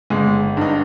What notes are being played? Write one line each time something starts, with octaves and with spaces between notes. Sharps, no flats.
G1 G#3
G2 D#4